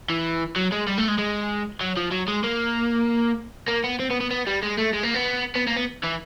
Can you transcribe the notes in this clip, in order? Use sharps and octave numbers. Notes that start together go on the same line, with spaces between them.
E3
F#3
G#3
G3
A3
G#3
G#3
F#3
F3
F#3
G#3
A#3
A#3
B3
C4
B3
B3
B3
G3
G#3
A3
G#3
A#3
B3
B3
A#3
B3
E3